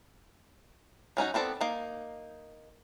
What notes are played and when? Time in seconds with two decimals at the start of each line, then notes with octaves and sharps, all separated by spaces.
1.17 F#3 C#4 D#4 F#4
1.34 B3 C4 A4 D5
1.61 A#3 D#4